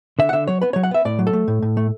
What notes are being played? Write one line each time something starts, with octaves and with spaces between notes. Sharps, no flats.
D3 E5
F#5
D3 E5
F#3 C#5
B3 B4
C#5
F#3
F#5
B3 E5
A2 D5
F#3
A4
A3
A2
A2
A3